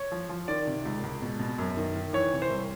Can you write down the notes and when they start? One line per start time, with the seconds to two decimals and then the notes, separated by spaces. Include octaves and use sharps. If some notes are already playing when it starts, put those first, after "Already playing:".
Already playing: C#5
0.12 F3
0.29 F3
0.48 D#3 D5
0.67 C3
0.85 C#2
1.03 C#2
1.22 B2
1.39 B2
1.58 F#2
1.77 D#3
1.96 D#3
2.13 E3 C#5
2.33 C3
2.42 C5
2.50 C2